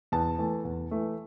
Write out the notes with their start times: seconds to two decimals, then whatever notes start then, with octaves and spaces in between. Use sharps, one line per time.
0.12 E2 A5
0.38 E3 A3
0.65 E2
0.91 E3 A3